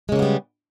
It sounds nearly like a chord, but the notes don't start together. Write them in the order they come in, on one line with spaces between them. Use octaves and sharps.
G#3 C#3 A#3 B3 G3